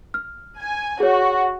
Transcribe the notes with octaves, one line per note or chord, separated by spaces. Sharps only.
F6
G#5
F#4 G#4 C#5